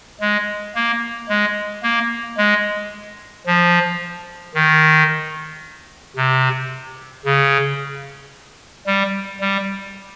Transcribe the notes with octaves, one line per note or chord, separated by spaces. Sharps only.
G#3
A#3
G#3
A#3
G#3
F3
D#3
C3
C#3
G3
G3